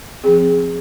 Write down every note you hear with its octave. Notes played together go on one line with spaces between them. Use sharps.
F3 C4 G#4